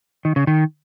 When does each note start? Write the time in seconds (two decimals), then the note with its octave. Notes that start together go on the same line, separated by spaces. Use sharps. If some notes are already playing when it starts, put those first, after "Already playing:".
0.25 D#3
0.36 C#3
0.47 D#3